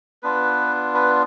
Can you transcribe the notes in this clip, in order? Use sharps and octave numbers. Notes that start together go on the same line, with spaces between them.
B3 D4 F4 B4
B4